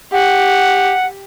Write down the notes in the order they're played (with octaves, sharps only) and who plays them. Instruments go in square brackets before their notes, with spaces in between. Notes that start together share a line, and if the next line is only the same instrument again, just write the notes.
[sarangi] G4 [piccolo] F#5